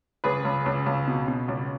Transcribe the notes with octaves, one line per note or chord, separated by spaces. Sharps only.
C#2 G#4 B4
C#2
C#2
C#2
B2
B2
C#2